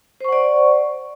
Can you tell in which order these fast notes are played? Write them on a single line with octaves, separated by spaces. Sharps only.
C5 C#6 F#5 D5